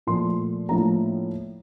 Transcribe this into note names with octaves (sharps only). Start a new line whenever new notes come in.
A#2 F3 A3 C6
A2 F3 A#3 D4 F4 A#5